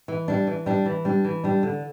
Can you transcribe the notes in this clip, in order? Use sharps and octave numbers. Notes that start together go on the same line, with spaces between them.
E3
G3 D4
E3
G3 D4
E3
G3 D4
E3
G3 D4
D3